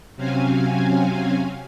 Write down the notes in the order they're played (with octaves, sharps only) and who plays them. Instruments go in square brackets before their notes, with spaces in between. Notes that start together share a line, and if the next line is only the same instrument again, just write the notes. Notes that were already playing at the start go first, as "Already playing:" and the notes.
[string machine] C3 F#3 C4 C#4 F5 G#5